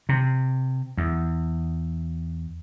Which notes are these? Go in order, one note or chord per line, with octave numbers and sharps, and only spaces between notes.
C3
E2